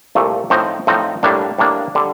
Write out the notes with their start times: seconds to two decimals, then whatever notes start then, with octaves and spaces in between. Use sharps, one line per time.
0.15 C2 A#2 A3
0.50 A2 F3 C4 D#4
0.87 A2 F3 C4 D#4
1.23 A2 G3 A#3 D4
1.58 A2 G3 A#3 D4
1.95 D3 G3